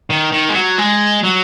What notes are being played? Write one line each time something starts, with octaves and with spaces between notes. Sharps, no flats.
D#3
D#3
G#3
F#3
G#3
F#3